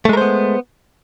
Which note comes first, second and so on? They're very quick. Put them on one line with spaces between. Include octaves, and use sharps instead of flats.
A3 G#3 A#4 C5 B3